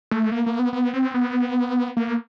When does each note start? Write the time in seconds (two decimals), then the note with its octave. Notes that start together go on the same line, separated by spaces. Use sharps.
0.11 A3
0.32 A#3
0.46 A#3
0.59 B3
0.73 B3
0.94 C4
1.14 B3
1.97 A#3